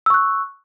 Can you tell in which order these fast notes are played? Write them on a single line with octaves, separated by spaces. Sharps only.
E6 C#6 F#6